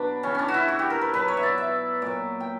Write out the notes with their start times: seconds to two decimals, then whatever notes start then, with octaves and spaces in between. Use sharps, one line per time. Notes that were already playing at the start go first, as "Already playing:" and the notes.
Already playing: B2 F#3 D4 B4
0.23 C#3 E3 C#4
0.35 C#4 D4
0.48 F#4
0.54 E4
0.68 F#4
0.79 G4
0.90 A#4
1.01 B4
1.14 B2 F#3 B4
1.28 C#5
1.37 E5
1.43 D5
1.58 E5
2.02 A#2 F#3 D5
2.40 G5